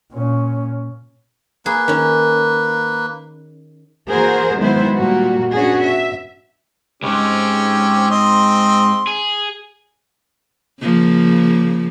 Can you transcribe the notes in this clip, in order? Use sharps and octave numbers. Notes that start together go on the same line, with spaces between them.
A#2 C#4
A#3 G#4 B4
D#3 C#4
E3 A#3 F#4 G#4 A#4 C5
D#3 F#3 G#3 B3 E4 C5
A#2 G3 A#3 F#4
B3 C#4 D4 F#4 G#4
E5
C#2 G#2 C4 C#4 G4
C4 D#5 C6
G#4
C#3 F3 A#3